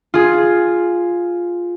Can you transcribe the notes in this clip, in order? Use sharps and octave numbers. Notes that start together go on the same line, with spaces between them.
F4 G#4